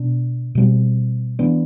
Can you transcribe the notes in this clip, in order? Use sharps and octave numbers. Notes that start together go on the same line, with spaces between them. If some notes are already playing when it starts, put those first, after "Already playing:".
Already playing: B2 B3 D4
B2 G3 C4
E3 B3 D4